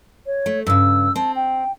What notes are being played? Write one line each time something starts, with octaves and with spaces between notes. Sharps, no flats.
C#5
A3
G2 C#3 E6
C4 A5
G5